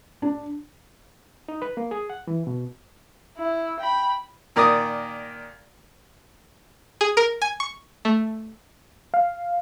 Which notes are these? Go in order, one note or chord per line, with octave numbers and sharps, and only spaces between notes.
D4
D#4
B4
A#3
G#4
F#5
E3
B2
E4
G5 B5
A#2 D#3 A#4 D5 D6 D#6
G#4
A#4
G#5
C#6
A3
F5